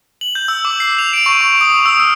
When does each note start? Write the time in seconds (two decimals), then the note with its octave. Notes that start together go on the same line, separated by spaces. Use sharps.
0.21 F#7
0.35 G6
0.48 E6
0.65 D6
0.80 C7
0.98 F7
1.13 D7
1.26 C#6
1.41 C#6
1.61 D#6
1.86 E6
2.00 F6